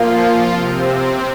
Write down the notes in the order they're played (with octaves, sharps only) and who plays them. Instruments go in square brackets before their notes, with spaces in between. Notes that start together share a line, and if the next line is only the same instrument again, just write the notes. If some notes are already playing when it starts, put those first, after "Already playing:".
Already playing: [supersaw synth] F3 F4 [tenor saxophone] A#3
[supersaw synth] C3 C4